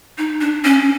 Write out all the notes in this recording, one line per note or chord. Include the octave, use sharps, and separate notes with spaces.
D#4
D4
C#4